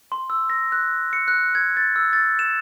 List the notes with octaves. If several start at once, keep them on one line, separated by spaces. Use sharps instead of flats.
C6
E6
A#6
F#6
C#7
F#6
G#6
A6
E6
A6
E7